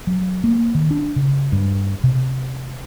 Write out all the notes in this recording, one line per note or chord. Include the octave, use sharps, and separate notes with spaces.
F#3
A#3
D#3
D4
C#3
G2
C3